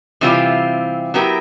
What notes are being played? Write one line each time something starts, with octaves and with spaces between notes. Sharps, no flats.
C3 E3 G3 C4 F4
F#3 B3 E4 G4 A#4